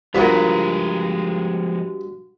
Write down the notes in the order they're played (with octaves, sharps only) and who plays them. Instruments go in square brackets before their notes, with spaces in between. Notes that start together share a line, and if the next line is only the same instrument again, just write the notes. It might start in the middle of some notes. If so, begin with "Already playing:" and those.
[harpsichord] G2 B3 [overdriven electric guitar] F3 G#3 [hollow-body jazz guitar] F4 A#4 [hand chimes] F#4